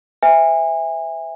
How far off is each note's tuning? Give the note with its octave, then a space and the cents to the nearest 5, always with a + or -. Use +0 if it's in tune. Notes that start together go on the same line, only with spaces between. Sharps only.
C5 -40 E5 +0 G#5 -30